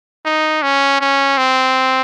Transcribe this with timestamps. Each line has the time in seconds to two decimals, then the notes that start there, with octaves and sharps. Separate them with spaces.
0.25 D#4
0.62 C#4
1.01 C#4
1.38 C4